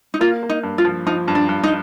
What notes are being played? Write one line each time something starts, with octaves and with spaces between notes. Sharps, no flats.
D#4
A#3 F4
A#3
D#4
G2
F4
F3
F3 D#4
G2
D4
G2
D#4